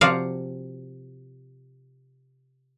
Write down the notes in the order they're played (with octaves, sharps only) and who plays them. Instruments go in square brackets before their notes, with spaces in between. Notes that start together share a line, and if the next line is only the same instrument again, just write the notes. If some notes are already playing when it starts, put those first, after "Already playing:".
[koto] C3 F3 F#4 D5 F5